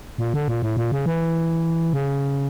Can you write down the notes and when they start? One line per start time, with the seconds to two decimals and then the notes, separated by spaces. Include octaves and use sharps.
0.18 A#2
0.34 D3
0.48 A#2
0.62 A2
0.77 A#2
0.92 C#3
1.06 E3
1.93 C#3